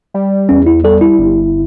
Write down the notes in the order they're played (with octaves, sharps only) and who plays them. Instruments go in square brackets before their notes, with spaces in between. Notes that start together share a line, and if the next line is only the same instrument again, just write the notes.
[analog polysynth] G3
[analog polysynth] E2 [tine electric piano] C#4
[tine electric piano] E4
[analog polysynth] G3 [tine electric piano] A4
[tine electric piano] E4
[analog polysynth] G1